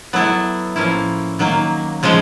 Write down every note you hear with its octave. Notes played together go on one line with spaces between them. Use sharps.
F#3 B3 E4 A4
A2 F3 A#3 C#4 E4
D#3 F#3 A#3
C#3 F3 G#3